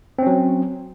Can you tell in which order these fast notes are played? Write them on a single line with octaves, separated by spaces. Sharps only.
C4 C#4 F#3